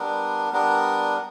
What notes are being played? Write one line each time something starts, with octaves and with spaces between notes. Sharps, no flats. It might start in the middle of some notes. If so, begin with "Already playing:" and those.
Already playing: G3 B3 D4 A#4
G3 B3 D4 A#4